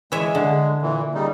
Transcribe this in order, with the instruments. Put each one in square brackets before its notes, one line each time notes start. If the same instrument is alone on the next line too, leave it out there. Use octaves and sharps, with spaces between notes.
[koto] E3 C#5 E5 [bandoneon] G#3
[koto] D3
[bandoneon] A#2 E3
C#3 G3 D#4